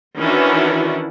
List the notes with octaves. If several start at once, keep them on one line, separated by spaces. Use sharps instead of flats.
D#3 E3 C#4 D4 E4 F#4